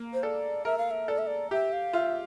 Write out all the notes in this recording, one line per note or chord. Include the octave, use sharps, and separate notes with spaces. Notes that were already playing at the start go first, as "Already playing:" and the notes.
Already playing: A#3
C5
A4 D5
A#4 E5
F5
E5
A4 D5
E5
D5
G4 E5
F5
F4 E5